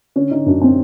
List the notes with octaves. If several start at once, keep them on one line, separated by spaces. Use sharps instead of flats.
D3 C#4
D3 D#4
F#2 D4
C4